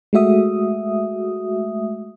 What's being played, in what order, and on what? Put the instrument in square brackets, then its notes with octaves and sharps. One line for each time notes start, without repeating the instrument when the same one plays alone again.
[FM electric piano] G#3 A3 F#4 E5 D#6